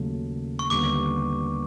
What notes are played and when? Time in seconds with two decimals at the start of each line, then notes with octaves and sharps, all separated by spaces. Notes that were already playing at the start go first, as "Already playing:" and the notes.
Already playing: D#2 C#3 F#3 A3
0.59 C#6
0.70 D#2 D3 G3 B3 D6